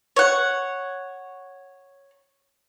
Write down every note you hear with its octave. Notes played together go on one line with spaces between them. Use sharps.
C#5 F#5